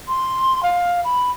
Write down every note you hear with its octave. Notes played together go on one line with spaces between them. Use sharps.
C6
F5
B5